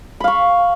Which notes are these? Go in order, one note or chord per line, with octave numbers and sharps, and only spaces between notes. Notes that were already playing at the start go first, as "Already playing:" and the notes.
F5 B5 C#6